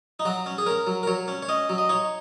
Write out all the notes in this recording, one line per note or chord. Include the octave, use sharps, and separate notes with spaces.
D#4
F#3 F#4
C#4
G#4
C#4 A#4
F#3
A#4
F#3 C#5
C#4
C#5
C#4 D#5
F#3
D#5
D#4 C#5